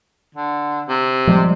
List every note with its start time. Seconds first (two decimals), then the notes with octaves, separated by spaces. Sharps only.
0.35 D3
0.89 C3
1.27 F3 G3 G#3